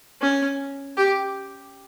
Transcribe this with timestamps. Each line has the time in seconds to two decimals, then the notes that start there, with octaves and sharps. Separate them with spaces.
0.21 C#4
0.97 G4